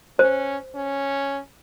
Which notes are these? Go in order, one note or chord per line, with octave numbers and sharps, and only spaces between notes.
C#4 C5
C#4